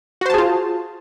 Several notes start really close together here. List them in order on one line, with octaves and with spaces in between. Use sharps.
F#4 C5 A5 G#4 F4